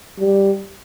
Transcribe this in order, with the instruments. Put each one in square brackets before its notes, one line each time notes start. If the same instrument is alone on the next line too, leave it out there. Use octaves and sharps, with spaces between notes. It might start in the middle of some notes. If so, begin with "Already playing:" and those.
[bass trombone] G3